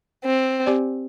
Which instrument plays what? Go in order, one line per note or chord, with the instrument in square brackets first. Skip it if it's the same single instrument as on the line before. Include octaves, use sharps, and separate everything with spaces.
[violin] C4
[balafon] C4 G4 D5